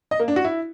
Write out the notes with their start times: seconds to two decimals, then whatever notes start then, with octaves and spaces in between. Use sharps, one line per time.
0.11 D#5
0.20 A#3
0.28 D4
0.36 F#4
0.45 E4